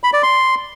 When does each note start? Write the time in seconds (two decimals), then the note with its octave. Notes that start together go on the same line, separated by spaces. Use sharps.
0.04 B5
0.13 D5
0.23 C6